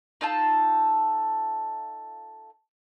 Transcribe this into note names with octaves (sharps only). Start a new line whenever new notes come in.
D#4 F4 A4 A5